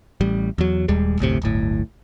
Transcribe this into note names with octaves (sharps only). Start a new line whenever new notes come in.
A1 G3
E2 F#3
D#1 D#2 G3 G#3
G1 D2 A2 C3
D1 G1 A2